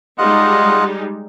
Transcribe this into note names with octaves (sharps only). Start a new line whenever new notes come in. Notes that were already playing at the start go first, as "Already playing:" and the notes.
G3 G#3 D#4 F4 D#5 F#5